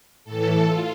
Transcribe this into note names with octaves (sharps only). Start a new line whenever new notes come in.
A2 E3 A4
F4